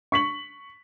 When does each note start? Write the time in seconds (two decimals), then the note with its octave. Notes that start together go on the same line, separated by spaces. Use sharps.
0.12 C#6 B6 F#7